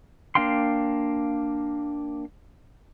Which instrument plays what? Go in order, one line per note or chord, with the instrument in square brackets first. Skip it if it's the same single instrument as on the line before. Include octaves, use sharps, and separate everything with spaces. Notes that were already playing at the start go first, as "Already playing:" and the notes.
[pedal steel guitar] A#3 D4 F5 G5 C6